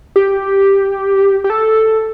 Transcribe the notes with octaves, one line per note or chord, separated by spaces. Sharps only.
G4
G4
A4